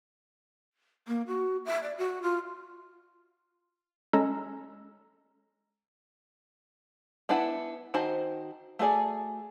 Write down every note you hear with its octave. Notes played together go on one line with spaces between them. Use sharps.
A#3
F#4
E5
D5
F#4
F4
G#3 C#4 A4 G#5 A#5 E6
B3 D4 E4 B4 F#5
D#3 F#4 C5 A5
A3 F#4 G#4 D5